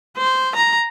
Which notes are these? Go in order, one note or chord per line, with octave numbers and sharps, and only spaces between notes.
C5
A#5